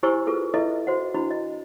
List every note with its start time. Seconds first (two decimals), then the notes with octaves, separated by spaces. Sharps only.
0.03 E4 G4 C5 G#5 C#6 E6
0.27 F4 G#4 A4 B4
0.54 E4 F4 A4 B4 D#5 E5
0.87 F#4 C5 F#5
1.14 D4 E4 F#4 B5
1.31 D#5